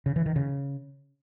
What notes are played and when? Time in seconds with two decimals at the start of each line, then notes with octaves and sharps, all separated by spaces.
0.06 C#3
0.16 E3
0.26 D#3
0.36 C#3